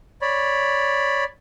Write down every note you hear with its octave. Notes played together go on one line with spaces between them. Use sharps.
C#5 D5 B5